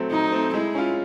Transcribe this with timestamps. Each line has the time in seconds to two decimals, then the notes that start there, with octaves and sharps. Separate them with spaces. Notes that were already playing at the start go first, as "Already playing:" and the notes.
Already playing: F#3 A3 C4
0.11 F#3 D#4
0.32 A3 C4
0.54 G#3 E4
0.75 C#4 F4